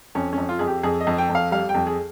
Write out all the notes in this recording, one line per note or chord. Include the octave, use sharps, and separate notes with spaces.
F2 C#4
F2 C#4
F4
F2 G#4
G4
F2 G#4
D#5
F2
G5
F2
F5
G3 F5
G5
F2
G#4